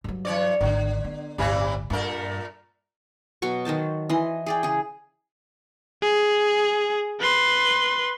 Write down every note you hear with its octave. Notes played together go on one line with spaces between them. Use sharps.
G2 F#3
E3 C#5 D5
G#1 D3 D#3
B3
D1 G1 C3 E3 G3
G2 A#2 A3 A#4
B2 F#3 F#4 C#6
D#3 F#3 C5 A5
E3 D#5 C6
G#4 D5 G5
C#3 G#4
G#4
B4 C6